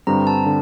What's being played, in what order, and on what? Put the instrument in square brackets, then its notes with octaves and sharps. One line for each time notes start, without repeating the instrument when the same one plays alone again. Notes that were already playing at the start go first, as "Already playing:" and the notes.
[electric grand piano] G2 D3 G3 C4 [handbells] A#5
[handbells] A5
[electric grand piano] D3